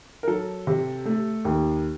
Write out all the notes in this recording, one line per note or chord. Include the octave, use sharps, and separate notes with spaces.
A#4
F#3 A4
C3
A3
D#2